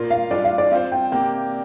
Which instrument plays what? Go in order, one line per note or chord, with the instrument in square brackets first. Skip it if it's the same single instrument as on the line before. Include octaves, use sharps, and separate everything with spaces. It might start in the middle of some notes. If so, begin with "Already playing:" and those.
Already playing: [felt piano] A#2 A#3 F4 A#4
[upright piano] F5
[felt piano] G3 D4 F4 [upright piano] D5
[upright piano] F5
D5
[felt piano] C4 F4 C5 [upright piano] F5
[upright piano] G5
[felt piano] C3 A#3 G4 [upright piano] G5